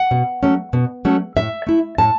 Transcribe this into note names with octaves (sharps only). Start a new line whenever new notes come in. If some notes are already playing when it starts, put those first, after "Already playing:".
Already playing: F#5
B2
F#3 A3 C#4
B2
F#3 A3 C#4
A2 E5
A3 E4
A2 A5